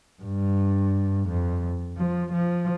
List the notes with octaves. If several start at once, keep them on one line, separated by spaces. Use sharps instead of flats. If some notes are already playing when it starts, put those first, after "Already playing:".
G2
F2
F3
F3